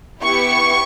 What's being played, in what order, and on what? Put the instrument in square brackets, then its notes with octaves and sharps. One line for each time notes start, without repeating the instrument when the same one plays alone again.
[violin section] B3 E4 G4 C#6